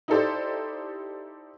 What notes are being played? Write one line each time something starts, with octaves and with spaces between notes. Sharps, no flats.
D#4 E4 G4 A4 C5 D5